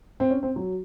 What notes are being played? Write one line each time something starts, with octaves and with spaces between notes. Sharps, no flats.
C4
C#4
C4
F#3